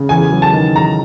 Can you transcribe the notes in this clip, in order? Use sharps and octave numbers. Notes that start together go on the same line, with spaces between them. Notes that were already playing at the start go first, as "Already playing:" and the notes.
Already playing: C#3
E2 G#5
F#3
A5
D#3
E2 A#5